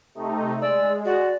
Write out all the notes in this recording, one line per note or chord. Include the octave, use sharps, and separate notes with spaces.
C3 A3 D#4
G#3 D5 E6
F#4 D5